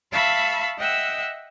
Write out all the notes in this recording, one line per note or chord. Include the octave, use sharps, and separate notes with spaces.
E5 F5 A5 B5 C#6 E6
D#5 E5 F#5 G5 E6